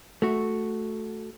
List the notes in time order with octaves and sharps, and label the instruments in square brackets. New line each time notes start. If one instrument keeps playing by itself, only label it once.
[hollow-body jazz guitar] A3 F#4